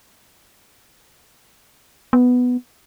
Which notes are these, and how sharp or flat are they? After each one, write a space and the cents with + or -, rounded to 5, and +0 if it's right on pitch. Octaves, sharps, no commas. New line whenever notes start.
B3 +5